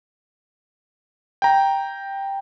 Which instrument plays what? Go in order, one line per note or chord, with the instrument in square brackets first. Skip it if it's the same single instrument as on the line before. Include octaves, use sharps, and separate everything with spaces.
[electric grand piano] G5 A#5